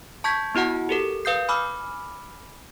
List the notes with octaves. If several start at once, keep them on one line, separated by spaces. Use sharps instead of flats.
A5 C#6 G6 G#6 B6
B3 E4 F#4 F#5 A5
G4 A4 A#4
B4 F5 D#6 G6 C7
G#5 B5 D6 E6 F6